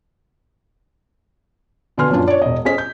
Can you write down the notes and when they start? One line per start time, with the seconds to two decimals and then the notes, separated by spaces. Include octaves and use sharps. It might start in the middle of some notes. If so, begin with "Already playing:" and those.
1.98 B2 D3 B4 G#5 C6 F6
2.10 F#2 A#2 C#4 D4 F4
2.28 C#5 D5
2.42 E1 D#5
2.65 C#4 G#4 C5 D#5 B6
2.78 G6